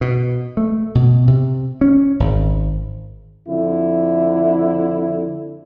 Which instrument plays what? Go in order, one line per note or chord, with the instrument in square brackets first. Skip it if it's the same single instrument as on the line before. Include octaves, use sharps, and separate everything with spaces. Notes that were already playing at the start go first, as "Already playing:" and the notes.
[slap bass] B2
A3
B2
C3
C#4
G#1
[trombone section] F2 D3 E4